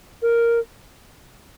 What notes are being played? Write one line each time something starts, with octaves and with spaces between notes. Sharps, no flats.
A#4